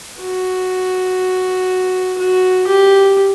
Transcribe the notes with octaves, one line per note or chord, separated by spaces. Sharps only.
F#4
F#4
G4